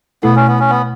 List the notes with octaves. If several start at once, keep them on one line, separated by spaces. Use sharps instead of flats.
B2 A3 B3 E4 A4
C#4
B3
C#4
B3